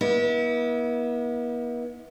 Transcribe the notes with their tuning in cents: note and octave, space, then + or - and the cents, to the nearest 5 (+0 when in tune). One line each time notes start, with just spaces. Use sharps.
B3 -45 E4 -35